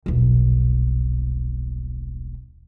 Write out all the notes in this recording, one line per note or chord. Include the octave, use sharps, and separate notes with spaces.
D#1 B1